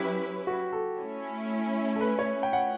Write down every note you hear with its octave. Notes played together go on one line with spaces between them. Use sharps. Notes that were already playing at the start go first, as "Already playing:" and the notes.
Already playing: F#3 C#4 E4 G4 B4
F#4
A4
A3 C#4 E4
A4
B4
C#5
G5
F#5